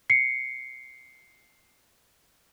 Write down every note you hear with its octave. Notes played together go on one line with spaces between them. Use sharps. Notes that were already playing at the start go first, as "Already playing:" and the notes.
C7 C#7